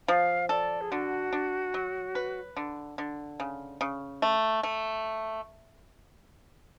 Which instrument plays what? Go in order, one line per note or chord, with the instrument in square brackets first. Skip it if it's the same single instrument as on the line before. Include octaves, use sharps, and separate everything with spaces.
[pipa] F3 [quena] F5
[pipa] A4 [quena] D5
[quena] G#4
[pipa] D3 [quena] F#4
[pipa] D4
F#3
B4
D3
D3
C#3
C#3
A3
A3